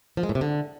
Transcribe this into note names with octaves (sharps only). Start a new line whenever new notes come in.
F3
G#3
A2
C3
D3